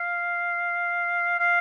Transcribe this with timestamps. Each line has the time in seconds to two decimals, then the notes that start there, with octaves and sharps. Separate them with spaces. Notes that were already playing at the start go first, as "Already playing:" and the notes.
Already playing: F5
1.39 F5